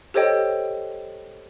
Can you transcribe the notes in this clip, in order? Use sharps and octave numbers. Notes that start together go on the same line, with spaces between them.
G4 A4 C5 C#5 D#5 G5